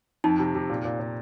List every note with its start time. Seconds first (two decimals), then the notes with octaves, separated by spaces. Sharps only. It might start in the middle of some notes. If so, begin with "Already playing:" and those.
0.24 F2 D#4
0.39 C3
0.55 C3
0.70 A#2
0.85 A#2
1.00 A#2